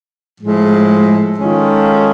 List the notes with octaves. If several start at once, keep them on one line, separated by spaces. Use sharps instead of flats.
A2 F3 G#3
D#3 G#3 C#4 F4 A4